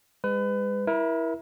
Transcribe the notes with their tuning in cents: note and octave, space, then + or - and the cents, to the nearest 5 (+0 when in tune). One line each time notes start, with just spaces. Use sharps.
G#3 -40 B4 +30
E4 -5 A#4 +35